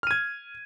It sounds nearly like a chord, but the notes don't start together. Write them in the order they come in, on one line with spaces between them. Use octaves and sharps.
F6 D#7 G#6